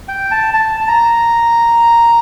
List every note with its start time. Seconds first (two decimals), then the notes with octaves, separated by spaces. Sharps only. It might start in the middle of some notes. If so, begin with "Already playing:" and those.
0.08 G5
0.31 A5
0.54 A5
0.81 A5
0.88 A#5